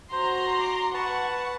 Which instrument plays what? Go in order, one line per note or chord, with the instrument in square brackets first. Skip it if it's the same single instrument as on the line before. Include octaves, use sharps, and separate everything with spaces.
[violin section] F#4 A#5 C6 [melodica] C5
[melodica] D6
[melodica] B4 A5 [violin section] F#5 C#6